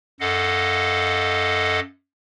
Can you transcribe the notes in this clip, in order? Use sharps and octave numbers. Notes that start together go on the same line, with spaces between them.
F#2 A4 D#5 F5 F#5